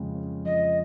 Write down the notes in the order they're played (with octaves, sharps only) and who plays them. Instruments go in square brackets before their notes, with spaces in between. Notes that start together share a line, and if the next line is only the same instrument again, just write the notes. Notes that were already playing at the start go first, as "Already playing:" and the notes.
Already playing: [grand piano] F2 C#3 G#3
C#4
[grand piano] F2 [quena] D#5